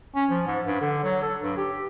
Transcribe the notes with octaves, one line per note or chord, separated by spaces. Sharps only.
C#4
F3
G#2
G2
D3
F#3
A4
G2
G4